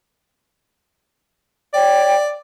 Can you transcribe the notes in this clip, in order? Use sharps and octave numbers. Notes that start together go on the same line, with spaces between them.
C#5 D5 G5